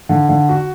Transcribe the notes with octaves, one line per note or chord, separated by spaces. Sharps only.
D3
D3
F#4